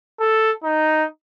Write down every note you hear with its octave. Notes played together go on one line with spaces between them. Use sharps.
A4
D#4